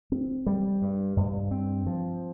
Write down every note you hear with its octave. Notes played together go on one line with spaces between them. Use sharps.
C4
G3
G2
G2
C4
F3